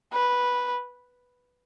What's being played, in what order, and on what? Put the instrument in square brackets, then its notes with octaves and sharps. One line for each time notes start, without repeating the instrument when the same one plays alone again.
[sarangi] B4